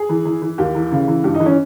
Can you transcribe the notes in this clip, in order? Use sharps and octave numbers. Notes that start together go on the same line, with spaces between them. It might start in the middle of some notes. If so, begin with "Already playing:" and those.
Already playing: G#4
E3
E3
E3
D#2 G4
E3
C#3
E3
G2 G4
D#4
E3
C#4